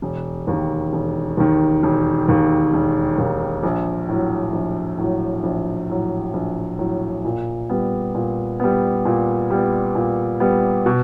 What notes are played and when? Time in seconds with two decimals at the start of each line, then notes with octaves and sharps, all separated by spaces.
0.02 E1
0.47 D#2 D#3
0.93 E1
1.37 D#2 D#3
1.83 E1
2.28 D#2 D#3
2.73 E1
3.18 D#2 D#3
3.63 A#1
4.08 A2 F#3
4.53 A#1
4.98 A2 F#3
5.44 A#1
5.89 A2 F#3
6.34 A#1
6.79 A2 F#3
7.25 A#2
7.69 G3 B3
8.15 A#2
8.60 G3 B3
9.05 A#2
9.50 G3 B3
9.95 A#2
10.40 G3 B3
10.86 B2